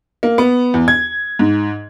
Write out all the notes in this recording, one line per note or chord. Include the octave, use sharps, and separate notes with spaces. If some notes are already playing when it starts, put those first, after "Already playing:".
A#3
B3
E2
G#6
G#2